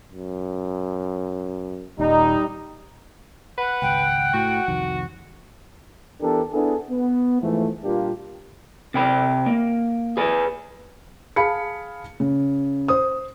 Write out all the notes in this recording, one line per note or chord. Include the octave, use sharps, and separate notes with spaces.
F#2
D#1 G3 D#4
B4 F#5
G#1 C#2 G5
A2 F#4
C2 F2 D#3
E3 B3 D4 G4 A4 A#4
B3 D4 E4 G#4 A4
B3
G#2 E3 F3 A3
A#2 G3 A#3 D4 F4 G4
C3 G5 B5
A#3
G#4 B4 G#5
G#4 F5 A5 B5 C#7
C#3
C5 D#6